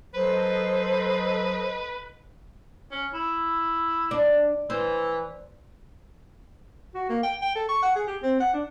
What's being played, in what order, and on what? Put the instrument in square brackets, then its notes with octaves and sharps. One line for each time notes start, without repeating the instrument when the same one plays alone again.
[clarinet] F#3 [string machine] A4 D#5 [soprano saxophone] B4 [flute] C5
[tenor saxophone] C#4
E4
[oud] D4
[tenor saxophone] E3 [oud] C5
[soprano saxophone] F#4
A#3
G5
G5
A4
C#6
F#5
G#4
G4
C4
F#5
D4